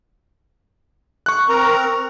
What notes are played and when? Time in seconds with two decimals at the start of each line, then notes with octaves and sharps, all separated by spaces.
1.26 C#6 F#6
1.49 C4 A#4 A#5